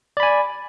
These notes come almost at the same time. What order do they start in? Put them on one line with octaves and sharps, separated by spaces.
D5 B5 G#5